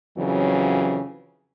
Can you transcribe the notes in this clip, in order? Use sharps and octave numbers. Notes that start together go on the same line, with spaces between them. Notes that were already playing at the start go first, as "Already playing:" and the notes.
F2 C#3 E3 F#3